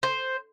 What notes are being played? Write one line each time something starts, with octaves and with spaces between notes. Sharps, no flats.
C5